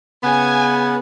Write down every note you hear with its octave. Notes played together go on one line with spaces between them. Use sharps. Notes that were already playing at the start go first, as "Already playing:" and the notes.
C#3 B3 G#5